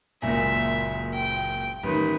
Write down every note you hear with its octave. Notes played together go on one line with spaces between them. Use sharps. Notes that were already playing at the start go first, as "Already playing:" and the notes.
F#1 C#2 A#2 E5
G5
A1 D#3 B4